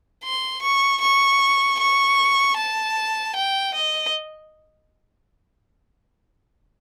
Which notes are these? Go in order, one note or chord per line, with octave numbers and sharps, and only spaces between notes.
C6
C#6
C#6
C#6
A5
G5
D#5